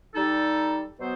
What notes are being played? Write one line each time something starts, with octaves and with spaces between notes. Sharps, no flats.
G3 D#4 A4
B2 F#3 B3 F#4 C5